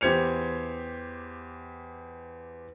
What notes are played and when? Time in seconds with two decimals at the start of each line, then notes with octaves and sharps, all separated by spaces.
0.01 E2 G4 C5 G#6 C#7 F7